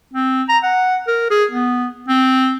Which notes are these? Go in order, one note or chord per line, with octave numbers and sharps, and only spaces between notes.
C4
A#5
F#5
A#4
G#4
B3
C4